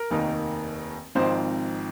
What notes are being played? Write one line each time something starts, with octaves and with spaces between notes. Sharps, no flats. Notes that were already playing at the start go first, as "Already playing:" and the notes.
Already playing: A#4
F1 D#2 D#3 A#3 D#4
G#1 G#2 F3 C4 D#4 C5